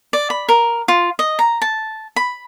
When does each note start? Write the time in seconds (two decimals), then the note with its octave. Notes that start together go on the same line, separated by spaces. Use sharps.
0.13 D5
0.30 B5
0.49 A#4
0.88 F4
1.19 D#5
1.39 A#5
1.62 A5
2.16 B5